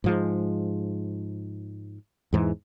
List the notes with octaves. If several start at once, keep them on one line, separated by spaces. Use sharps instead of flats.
G#2 F3 G#3
E2 G#2 E3